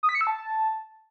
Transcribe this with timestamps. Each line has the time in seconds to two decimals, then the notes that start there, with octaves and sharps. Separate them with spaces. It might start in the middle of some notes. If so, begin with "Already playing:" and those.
0.03 D#6
0.09 B6
0.15 C#7
0.21 E6
0.27 A5